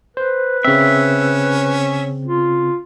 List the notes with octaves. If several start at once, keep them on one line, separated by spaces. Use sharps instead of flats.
B4 C5
C#3 C4 C#4 E5
F4